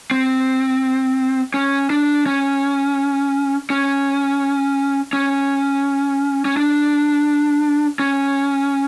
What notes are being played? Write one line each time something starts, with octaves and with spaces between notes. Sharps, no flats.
C4
C#4
D4
C#4
C#4
C#4
C#4
D4
C#4